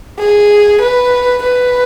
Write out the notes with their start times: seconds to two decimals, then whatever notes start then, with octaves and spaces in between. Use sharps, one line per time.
0.19 G#4
0.81 B4
1.43 B4